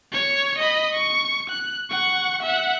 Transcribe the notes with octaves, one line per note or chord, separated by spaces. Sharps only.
C#5 C#6
D#5 B5
C#6
F#6
F#5 C#6
E5 F#5